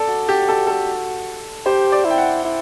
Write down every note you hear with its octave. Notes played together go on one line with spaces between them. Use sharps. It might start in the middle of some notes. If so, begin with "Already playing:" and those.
Already playing: A4 D5
F#4
G4
A4
A4
G4 C5
D5
E4
G5
F#5
E4